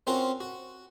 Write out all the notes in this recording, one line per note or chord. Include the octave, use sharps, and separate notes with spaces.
C4 C#4 F4 F#4 A#4
F#4